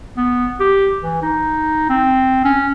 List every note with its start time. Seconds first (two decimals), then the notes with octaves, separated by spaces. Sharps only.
0.17 B3
0.60 G4
1.01 E3
1.22 D#4
1.89 C4
2.45 C#4